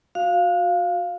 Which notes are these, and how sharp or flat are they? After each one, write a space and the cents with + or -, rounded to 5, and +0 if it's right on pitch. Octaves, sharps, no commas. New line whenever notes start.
F#4 -25 F5 +0